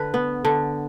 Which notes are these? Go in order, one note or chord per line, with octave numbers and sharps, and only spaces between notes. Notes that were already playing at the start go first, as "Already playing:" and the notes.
Already playing: D3 B4
B3
D3